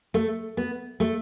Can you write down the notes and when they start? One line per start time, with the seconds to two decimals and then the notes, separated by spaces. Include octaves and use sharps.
0.14 A3
0.57 B3
1.00 A3